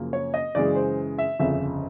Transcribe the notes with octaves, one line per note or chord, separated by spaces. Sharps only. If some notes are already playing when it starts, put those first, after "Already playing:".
Already playing: F#2 C#3 F3 A#3
C#5
D#5
F#2 C#3 E3 G#3 D5
C5
E5
G1 F2 C#3 E5